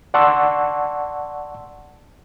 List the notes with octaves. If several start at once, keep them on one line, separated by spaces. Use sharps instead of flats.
D5 F#5 A5 C6 C#6 E6